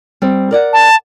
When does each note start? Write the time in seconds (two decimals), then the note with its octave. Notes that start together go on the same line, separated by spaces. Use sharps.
0.22 G3 C4
0.51 A#4 D5 F#5
0.73 A5